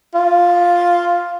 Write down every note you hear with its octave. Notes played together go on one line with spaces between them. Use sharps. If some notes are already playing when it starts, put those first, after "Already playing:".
F4